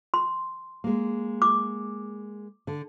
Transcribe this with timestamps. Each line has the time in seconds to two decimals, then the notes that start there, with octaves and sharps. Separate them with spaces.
0.14 C6
0.84 G#3 A#3
1.42 D6
2.67 D3